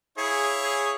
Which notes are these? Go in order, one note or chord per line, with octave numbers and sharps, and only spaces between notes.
E4 G#4 C#5 F5
G#4